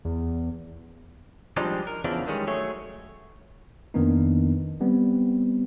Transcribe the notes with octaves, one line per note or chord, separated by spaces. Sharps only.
E2
F3 G3 G#3 C4 D4 D#4
A#4
E2 C#3 E3 F3 D4
D#3 G3 G#3 C#4
F#3 A3 G#4 C#5
F2 D#3 A#3 B3 D4 D#4
G3 B3 C4